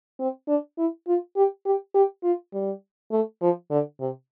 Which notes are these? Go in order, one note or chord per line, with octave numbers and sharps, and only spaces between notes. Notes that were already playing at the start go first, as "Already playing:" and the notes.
C4
D4
E4
F4
G4
G4
G4
F4
G3
A3
F3
D3
C3